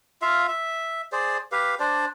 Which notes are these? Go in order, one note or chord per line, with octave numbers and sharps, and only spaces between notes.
F4 E5 F5
E5
G#4 C5 D5
G4 B4 F5
D4 C5 D5